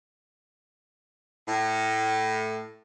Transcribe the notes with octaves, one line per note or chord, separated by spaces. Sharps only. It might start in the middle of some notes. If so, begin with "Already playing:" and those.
A2